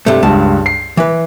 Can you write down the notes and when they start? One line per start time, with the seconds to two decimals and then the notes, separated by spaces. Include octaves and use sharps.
0.06 G2 C3 A3
0.23 C#2 G2 A5
0.66 C7
0.97 E3 B4